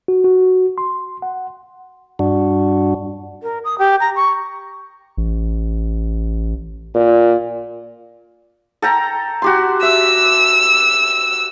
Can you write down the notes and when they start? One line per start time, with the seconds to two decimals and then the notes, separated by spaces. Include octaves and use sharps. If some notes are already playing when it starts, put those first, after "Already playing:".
0.08 F#4
0.24 F#4
0.78 C6
1.22 F#5
2.19 G2 D4 F#4
3.43 A#4
3.64 D#6
3.78 G4
4.00 A#5
4.16 C#6
5.18 A1
6.95 A#2
8.82 A4 G5 A#5
9.42 F#4 G4 C6
9.82 E5 E6